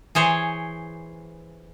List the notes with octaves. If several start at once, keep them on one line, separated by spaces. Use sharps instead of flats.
E3 G#4 C5 C#5